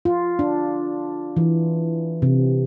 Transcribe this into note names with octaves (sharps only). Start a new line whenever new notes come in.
F4
D4
E3
C3